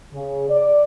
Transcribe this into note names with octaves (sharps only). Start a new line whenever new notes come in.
C#3
D5